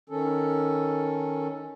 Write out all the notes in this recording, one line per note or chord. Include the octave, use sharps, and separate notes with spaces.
D#3 C#4 A4